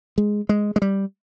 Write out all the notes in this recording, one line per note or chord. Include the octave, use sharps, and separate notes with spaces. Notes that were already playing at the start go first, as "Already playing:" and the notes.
G#3
G#3
G#3
G3